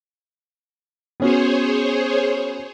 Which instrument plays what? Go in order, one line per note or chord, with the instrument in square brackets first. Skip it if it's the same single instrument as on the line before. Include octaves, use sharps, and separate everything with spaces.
[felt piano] B3 C#4 F#4 [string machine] G#4 C5 C#5